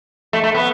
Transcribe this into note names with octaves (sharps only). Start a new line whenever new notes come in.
A3
A3
B3